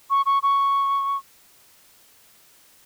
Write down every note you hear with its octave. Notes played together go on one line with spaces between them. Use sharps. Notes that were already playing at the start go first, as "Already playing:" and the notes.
C#6
C#6
C#6